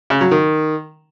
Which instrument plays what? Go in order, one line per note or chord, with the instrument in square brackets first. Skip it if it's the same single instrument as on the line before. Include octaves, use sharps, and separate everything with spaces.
[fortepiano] C#3
F#3
D#3